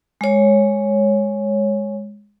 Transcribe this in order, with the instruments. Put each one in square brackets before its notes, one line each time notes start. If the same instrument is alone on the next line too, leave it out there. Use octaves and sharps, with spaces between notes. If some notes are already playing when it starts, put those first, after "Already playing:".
[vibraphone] G#3 C#5